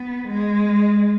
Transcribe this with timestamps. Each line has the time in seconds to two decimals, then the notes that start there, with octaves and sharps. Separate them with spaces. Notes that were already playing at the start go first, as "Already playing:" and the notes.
Already playing: B3
0.28 G#3